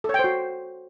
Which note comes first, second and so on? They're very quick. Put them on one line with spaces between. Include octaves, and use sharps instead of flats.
A4 C#5 G5 C5 F#4